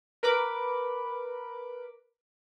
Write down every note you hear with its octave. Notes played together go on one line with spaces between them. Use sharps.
A#4 B4 B5 D6